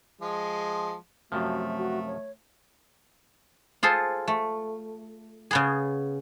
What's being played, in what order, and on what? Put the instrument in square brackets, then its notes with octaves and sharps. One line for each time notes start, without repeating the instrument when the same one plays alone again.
[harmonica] F3 G#3
[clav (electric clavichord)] F#2 C3 F3 [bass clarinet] A3 [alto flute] F#4
[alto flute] F#4
C#5
[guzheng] F4 G#4 A4 C5
A3
C#3 B3 G#4